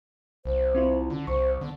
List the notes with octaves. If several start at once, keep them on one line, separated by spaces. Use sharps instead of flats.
C2 C5
C4 E4 F4
D3 C#4
C2 C5 C#6
D3 B3